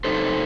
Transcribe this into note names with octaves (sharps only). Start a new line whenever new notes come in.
C3 F#3 C4 D#4 A4 C5